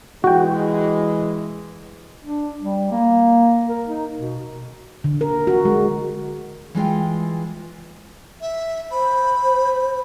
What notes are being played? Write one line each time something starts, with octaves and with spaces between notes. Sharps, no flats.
E3 G#3 F#4 G5
D4
G3
A#3
A#4
D#4
B2
D3
A#4
F#4
G#3
E3 G#3 F4 G5
E5
C5 B5